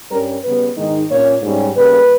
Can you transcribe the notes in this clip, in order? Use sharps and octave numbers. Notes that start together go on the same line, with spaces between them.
G2 G3 C#4 A#4
C#3 G3 B3 B4
G#2 D#3 G#3 D#4
A#2 A#3 C#4 C#5
G#2 G3 C#4
C#3 G3 A#3 B4